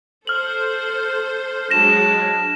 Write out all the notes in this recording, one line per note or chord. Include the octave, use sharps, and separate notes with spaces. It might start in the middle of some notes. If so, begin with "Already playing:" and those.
A4 C5 F6 F#7
F#3 G#3 D4 A#6 E7